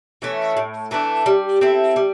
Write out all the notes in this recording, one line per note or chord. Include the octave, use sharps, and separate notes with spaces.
E3 A3 C#4
A2
E3 A3 D4
G3
C4 E4 A4
G3